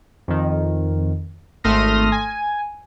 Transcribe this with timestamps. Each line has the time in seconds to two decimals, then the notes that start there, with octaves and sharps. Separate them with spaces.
0.28 F2 D#3
1.64 G#1 A3 C6 D#6 F6 A#6
2.12 G#5